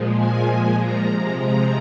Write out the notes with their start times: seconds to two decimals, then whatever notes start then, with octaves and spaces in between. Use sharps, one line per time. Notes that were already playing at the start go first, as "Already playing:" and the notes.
Already playing: A#2 F3 G#3
0.16 G#5
0.78 A#5
1.09 C3 F3 G#3
1.40 A#5